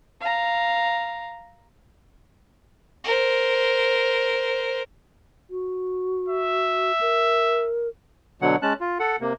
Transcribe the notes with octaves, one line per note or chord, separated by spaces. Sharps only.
F5 A#5
A#4 C5
F#4
E5
A#4
B2 D3 F#3 F#5
G#3 C#4 A5 F#6
F4
A4 F#5
C3 A#3